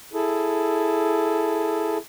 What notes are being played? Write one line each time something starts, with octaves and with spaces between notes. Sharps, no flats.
E4 G#4 A4